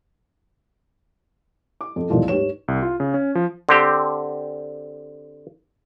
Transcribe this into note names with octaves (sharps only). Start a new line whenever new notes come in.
D6
F2
G#1 D#2 A#2 E3 F3 G#3
G#2 G4 B4 C#5 E7
C2
F4
C#3
C#4
F3
D3 C4 G4